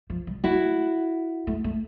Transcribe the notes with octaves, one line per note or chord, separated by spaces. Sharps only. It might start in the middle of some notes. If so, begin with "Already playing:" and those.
F3
G3
A3 E4 F#4
A3
A3